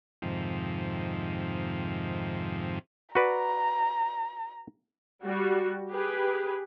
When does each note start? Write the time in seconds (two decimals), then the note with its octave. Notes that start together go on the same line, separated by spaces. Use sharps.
0.22 F2 G#2 C3 D#3 F3
3.15 F#4 B4 D5 A#5
5.24 G3 F#4
5.90 G4 G#4 B4